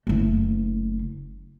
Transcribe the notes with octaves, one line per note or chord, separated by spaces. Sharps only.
F#1 A3